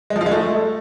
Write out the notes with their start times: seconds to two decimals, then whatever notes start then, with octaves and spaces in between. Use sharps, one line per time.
0.10 G#3
0.16 F3
0.21 F4
0.26 G#3
0.31 A3